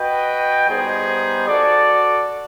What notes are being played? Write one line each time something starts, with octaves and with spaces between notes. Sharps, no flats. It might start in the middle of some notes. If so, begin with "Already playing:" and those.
Already playing: F#4 B4 D#5 G5
G3 B3 D#4 G#4 C5
F#4 A4 D5